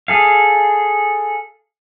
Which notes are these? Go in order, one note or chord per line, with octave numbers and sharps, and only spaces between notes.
G#4 A4 F5